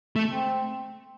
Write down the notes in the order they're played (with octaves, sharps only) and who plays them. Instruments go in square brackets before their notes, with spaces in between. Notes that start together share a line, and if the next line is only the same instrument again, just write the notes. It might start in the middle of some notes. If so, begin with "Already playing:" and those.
[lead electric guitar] A3
[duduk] C4